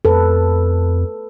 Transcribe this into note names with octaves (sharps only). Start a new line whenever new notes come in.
F2 A4 B4